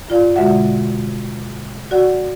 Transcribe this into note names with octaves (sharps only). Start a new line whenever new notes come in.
G2 F4 D5 F5
B2 D3 G#3 F#4 E5 F#5
F#4 D5 F#5